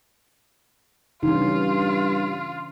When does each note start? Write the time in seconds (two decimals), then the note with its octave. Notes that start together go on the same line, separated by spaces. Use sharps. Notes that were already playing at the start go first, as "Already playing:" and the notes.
1.23 G2 C#3 E3 C#4 D#4 F4